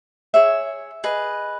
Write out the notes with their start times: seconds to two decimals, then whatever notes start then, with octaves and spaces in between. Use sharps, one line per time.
0.34 G#4 C#5 E5
1.04 G#4 B4 D#5